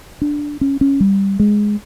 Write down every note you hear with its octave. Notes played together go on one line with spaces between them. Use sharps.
D4
C#4
C#4
G3
G#3